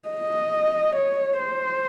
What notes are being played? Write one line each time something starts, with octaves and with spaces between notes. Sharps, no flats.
D#5
C#5
C5